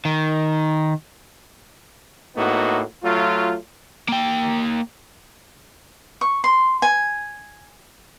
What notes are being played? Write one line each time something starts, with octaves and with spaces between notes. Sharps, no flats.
D#3
A2 A#3 B3 D#4 F#4
F#3 A3 F4
A#3 G5
C#6
C6
G#5